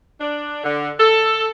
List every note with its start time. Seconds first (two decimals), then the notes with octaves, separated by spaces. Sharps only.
0.21 D4
0.64 D3
1.00 A4